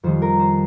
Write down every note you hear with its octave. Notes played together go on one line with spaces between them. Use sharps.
F2 D#3 G3 C5
A#4
C5